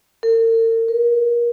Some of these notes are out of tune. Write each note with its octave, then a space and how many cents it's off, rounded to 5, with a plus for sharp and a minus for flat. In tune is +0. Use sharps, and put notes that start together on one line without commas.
A#4 -45
A#4 +30